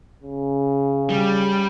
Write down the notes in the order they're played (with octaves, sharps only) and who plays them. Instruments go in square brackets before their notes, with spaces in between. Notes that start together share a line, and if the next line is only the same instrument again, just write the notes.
[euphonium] C#3
[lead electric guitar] G3